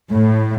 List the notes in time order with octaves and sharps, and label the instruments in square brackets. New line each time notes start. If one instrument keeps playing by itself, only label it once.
[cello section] A2